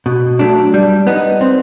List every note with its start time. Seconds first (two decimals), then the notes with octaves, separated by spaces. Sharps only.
0.06 B2
0.39 F#3 A3 D4
0.74 G3
1.07 B3 D#4
1.41 C4